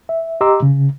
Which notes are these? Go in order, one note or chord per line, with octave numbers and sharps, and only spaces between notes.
E5
G4 D#5 A#5 C6 D6 E6
C#3